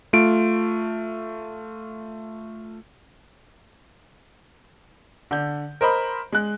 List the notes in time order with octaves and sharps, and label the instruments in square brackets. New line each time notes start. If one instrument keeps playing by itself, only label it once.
[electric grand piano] A3 F4 D7
[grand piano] D3 G6
A#4 C5 D#5 B5
G#3 F#6